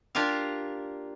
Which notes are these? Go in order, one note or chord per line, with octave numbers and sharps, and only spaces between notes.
A#3 D4 F4 G4 A#4 F5